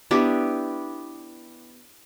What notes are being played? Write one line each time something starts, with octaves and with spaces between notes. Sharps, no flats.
B3 D4 E4 G4